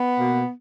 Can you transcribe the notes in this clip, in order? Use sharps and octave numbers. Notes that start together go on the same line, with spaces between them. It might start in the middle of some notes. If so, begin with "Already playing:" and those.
Already playing: B3
B2 A#3